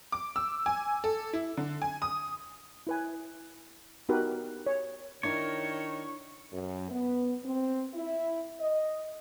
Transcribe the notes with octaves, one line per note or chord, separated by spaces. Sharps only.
D6
E6
G#5
A4
E4
D3
G#5
D#6
E4 B4 G#5
B3 D#4 F#4 G4 A#4 B4
C#5
D#3 D4 E4 A#4 C#5
F#2
B3
C4
E4
D#5